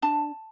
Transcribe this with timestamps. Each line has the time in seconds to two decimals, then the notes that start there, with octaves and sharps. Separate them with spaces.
0.02 D4 A5